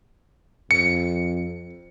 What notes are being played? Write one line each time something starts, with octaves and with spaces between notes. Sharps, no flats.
F2 C#7